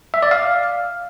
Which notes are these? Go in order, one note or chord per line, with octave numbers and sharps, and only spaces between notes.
E5
D5
F5